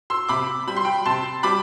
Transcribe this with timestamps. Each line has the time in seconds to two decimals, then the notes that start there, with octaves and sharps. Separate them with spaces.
0.10 C6 E6
0.29 C3 B5 D6
0.67 G3 B5
0.76 C6
0.85 G5 B5
1.05 C3 A5 C6
1.43 G3 B5 D6